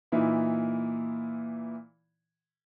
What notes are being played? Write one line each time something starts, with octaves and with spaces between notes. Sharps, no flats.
A#2 E3 D#4 E4